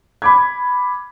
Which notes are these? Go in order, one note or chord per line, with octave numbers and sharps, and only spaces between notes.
B5 D6 G#6